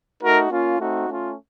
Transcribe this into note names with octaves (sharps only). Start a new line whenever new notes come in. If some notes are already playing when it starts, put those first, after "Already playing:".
A3 D#4 F#4 A#4
A#3 C#4 F4
A3 C4 D#4 F#4
A3 C#4 F4